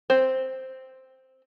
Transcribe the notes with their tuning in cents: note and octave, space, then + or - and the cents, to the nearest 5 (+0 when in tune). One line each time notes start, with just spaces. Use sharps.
C4 +0 C5 +0